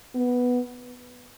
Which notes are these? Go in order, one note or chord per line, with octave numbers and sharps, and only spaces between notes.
B3